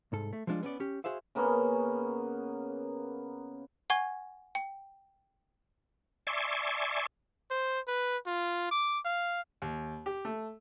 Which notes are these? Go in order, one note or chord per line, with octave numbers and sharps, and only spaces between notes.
C2 G#2 A4
A3
F3 G3 G#3 D4 F4
B3 C#4 D5
C#4 G4
F#4 G#4 C5 E5 F5
C#3 A#3 B3 C#4
F#5 G#5 C#6 G#6
G5
D5 E5 G#5 A5 C6 C#6
C5
B4
F4
D6
F5
D#2
G4
A3